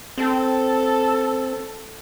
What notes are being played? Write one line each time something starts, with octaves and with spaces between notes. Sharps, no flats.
C4 A4